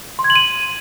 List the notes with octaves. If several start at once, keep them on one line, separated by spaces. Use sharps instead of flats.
C6
G#6
F#7
D#7